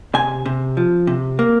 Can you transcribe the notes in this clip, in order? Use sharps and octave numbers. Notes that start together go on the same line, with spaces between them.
C3 G#5
C3
F3
C3
A#3